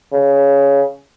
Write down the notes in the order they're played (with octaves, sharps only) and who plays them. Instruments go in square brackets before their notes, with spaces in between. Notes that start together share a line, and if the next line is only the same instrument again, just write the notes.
[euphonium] C#3